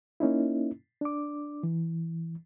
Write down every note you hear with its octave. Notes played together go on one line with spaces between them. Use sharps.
A#3 C#4 D#4 E4
D4 D6
E3